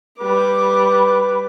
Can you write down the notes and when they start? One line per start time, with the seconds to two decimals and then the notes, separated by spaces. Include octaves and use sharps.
0.19 G3 B4 D6